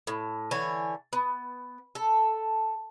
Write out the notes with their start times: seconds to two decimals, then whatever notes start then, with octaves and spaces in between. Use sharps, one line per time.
0.07 A2
0.51 D3 E3 C#5 G#5
1.13 B3
1.95 A4